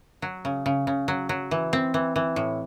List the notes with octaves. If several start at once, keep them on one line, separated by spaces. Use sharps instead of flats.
F#3
C#3
C#3
C#3
F#3
F#3
E3
C4
E3
E3
A2